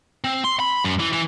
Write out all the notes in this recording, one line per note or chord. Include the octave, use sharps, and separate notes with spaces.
C4
C6
B5
F#2
E3
E3